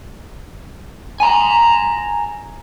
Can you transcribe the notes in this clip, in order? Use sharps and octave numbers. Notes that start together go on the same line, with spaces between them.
G#5 A#5